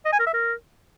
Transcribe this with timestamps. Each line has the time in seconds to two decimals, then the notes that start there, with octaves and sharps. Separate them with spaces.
0.05 D#5
0.12 G#5
0.20 A#4
0.27 E5
0.34 A#4